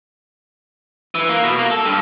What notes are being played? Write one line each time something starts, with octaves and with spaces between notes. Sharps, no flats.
E3
A#3
B2
A#3
A4
G2